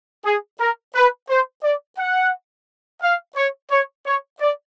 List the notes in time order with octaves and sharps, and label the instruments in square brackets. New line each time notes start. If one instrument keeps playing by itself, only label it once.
[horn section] G#4
A#4
B4
C5
D5
F#5
F5
C#5
C#5
C#5
D5